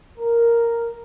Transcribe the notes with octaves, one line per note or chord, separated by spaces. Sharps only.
A#4